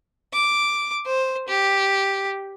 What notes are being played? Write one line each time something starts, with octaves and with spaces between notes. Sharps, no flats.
D6
C5
G4